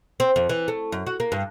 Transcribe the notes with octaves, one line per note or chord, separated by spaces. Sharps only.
C4
F2
E3
A3
F#2
F#4
A#3
G2